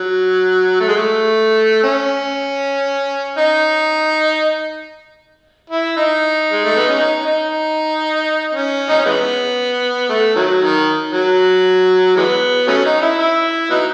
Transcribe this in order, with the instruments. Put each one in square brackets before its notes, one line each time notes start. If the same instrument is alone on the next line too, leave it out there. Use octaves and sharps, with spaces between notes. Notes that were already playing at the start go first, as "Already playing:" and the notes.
Already playing: [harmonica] F#3
A3
G#3
A3
C#4
D#4
E4
D#4
G#3
A3
B3
C#4
D#4
D#4
C#4
D#4
C#4
E3 G#3 B3
A3
D#3 F#3
D#3
F#3
E3 G#3 B3
F#3 A3 C#4
D#4
E4
E4
F#3 B3 D#4